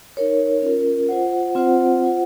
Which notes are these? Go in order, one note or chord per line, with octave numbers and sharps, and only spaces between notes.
D#4 A#4 C#5
C#4 F4 A#4
F4 C5 F#5
C4 F4 C5 F#5
F4 C5 F#5